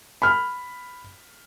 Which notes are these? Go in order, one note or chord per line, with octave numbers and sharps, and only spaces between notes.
B5 F6